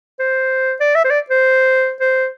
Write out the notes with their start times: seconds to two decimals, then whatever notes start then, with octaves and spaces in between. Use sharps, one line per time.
0.20 C5
0.81 D5
0.95 E5
1.04 C5
1.11 D5
1.30 C5
2.01 C5